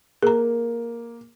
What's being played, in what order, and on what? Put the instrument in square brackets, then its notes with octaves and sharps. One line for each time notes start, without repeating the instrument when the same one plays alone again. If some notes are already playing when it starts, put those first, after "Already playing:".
[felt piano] A#3 [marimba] G#4 A#5